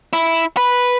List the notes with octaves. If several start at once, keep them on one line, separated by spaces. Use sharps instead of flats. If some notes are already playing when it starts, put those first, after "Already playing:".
E4
B4